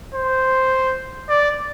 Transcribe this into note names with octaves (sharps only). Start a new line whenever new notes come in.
C5
D5